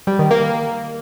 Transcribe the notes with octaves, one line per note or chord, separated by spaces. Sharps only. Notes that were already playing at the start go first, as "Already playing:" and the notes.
G3
D#3
A#3